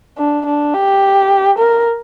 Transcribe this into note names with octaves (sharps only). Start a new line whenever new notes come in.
D4
D4
G4
A#4